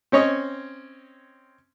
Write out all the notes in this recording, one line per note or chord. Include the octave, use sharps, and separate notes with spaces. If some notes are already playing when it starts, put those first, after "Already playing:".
C4 C#4 C#5 D#5